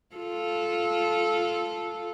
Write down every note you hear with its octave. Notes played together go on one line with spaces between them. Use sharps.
F4 A4